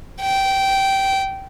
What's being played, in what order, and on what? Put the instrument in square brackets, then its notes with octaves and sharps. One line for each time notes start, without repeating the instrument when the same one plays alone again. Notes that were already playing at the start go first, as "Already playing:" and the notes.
[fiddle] G5